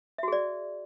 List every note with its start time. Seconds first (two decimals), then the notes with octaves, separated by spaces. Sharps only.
0.18 E5
0.23 F#4
0.28 G#4
0.32 D5